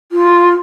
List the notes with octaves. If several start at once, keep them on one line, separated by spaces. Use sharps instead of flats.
F4